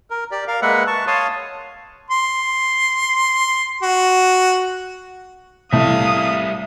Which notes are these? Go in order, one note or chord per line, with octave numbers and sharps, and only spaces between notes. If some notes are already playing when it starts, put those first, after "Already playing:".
A#4
G4 D5
A#4 F5
G#3 A#3 B4 E5 F#5
A5 C#6
C#5 F5 A5 C6 D#6
C6
F#4
C2 A2 G3 E5 F5 D#6